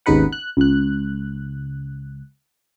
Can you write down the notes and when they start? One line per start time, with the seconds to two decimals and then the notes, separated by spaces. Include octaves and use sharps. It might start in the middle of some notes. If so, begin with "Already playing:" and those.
0.06 G#1 D#2 C#3 D#4 B4 F#5
0.32 F#6
0.57 C#2 F#6